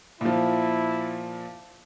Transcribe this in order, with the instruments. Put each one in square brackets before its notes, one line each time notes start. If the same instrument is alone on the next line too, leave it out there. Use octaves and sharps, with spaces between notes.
[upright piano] A#2 F3 [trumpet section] E4